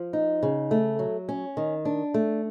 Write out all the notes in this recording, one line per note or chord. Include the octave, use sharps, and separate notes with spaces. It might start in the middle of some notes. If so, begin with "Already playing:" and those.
Already playing: F3
D#4
C#3
A3
F#3
C#4
D#3
D4
A3